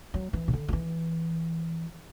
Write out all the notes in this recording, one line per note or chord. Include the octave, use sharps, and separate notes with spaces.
F#3
E3
C3
D3
F#3
E3